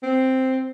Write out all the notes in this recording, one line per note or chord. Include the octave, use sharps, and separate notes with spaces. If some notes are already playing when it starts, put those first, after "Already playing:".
C4